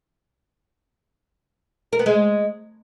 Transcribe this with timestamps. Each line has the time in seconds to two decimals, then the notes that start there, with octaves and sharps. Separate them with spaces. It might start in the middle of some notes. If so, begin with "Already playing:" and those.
1.93 A#4
1.99 B3
2.06 G#3